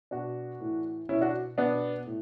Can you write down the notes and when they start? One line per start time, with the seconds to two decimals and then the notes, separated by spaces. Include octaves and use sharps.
0.11 B2 D4 F#4
0.61 A2 E3
1.09 B2 C#4 E4
1.21 D4 F#4
1.58 B2 B3 D4
2.07 A2